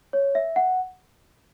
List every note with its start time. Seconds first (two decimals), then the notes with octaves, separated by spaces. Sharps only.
0.13 C#5
0.35 E5
0.56 F#5